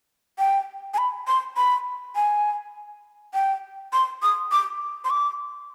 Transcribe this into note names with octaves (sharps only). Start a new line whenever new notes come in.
G5
G#5
B5
C6
B5
G#5
G5
C6
D#6
D6
C6
D6